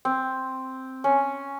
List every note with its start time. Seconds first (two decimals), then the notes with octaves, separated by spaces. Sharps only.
0.05 C4
1.04 C#4